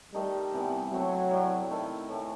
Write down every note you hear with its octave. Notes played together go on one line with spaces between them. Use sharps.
D#3 G3 A3 D#4
C3 E3 B3
F#3 A3 C4 F#4 C5
A2 G3 C4
D#3 A3 E4
A2 E3 A3